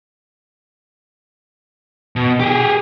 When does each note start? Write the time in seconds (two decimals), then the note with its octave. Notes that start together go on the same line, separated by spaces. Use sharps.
2.16 B2
2.40 G4 G#4